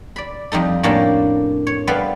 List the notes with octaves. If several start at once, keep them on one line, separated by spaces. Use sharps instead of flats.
D5 B5
F2 G3 D#4 A4
A2 A#3 C#4 D4 G4 A4
C#5
G3 B3 A4 B4 F5